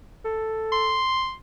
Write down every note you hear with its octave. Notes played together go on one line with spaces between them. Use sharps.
A4
C6